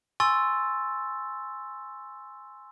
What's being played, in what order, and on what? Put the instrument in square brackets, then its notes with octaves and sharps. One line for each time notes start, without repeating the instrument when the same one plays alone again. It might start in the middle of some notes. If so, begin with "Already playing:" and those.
[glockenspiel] G#5 C6 C#6 E6 A6